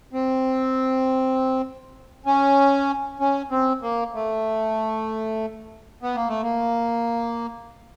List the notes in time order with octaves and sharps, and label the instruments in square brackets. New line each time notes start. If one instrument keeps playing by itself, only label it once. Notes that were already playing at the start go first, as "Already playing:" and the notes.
[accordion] C4
C#4
C#4
C4
A#3
A3
B3
A#3
A3
A#3